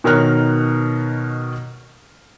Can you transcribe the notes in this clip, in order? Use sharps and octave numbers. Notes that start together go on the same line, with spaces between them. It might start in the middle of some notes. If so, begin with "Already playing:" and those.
B2 D#3 A#4 C#5 F6 F#6